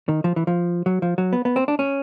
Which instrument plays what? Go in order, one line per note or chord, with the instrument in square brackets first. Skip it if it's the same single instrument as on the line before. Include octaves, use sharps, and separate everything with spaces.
[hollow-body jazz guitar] D#3
F3
E3
F3
F#3
F3
F#3
B3
B3
C4
D4
C#4